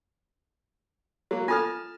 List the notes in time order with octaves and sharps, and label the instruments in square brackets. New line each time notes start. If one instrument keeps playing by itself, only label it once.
[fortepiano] F#3 A#3
[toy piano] F4 A4 [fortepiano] G#5 A5 F6